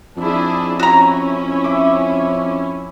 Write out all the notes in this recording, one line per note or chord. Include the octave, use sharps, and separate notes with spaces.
F2 D4 E4 G#4
C#4 E4 F#4 A#5
E5 D6